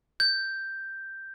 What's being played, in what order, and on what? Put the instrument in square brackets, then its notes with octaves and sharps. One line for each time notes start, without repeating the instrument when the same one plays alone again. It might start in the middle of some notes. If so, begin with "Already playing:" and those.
[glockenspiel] G6